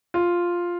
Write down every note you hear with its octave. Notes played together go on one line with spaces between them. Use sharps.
F4